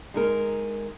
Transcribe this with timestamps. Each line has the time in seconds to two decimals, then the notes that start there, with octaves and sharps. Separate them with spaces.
0.14 G#3 D#4 A#4